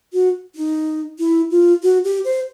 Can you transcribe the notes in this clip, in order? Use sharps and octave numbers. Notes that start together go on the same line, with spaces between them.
F#4
D#4
E4
F4
F#4
G4
C5